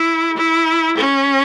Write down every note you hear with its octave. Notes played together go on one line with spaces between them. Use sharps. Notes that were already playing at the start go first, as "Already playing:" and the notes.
Already playing: E4
E4
C#4